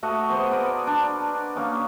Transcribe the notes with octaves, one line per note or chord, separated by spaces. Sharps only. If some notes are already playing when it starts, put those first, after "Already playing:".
A3 F#4 D#5 F#5
B3 G#4 C5 F#5
A#4 B4 D5 D#5
D4
A#3 C#4 D#4